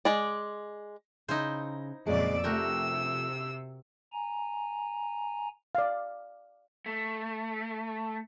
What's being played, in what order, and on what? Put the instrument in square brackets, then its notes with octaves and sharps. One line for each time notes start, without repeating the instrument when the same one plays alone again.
[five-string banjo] G#3 D5
[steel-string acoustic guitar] C#3 [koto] D#4 E4 C5
[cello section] F2 A#2 D5 [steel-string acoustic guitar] C#3 F#3 G#3
[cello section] C3 [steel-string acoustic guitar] F3 A3 [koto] F#4 G4 A#4 [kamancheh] E6
[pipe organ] G#5 A#5
[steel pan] D5 F5
[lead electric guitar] A3